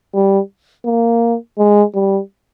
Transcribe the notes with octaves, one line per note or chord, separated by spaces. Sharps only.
G3
A#3
G#3
G3